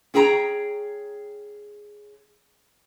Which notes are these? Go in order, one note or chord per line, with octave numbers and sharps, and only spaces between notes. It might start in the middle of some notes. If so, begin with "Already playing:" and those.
C#4 G#4 G5 A#5